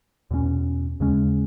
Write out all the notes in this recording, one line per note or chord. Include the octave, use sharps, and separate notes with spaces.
E2 B2 A3 C#4
D#2 C#3 G#3 C#4